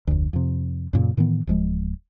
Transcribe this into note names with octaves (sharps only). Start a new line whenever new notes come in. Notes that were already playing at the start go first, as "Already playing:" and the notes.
F1 D2
F2 C3
F#2 A#2 C#3
A2 D#3 E3 B3
D1 F3 G#3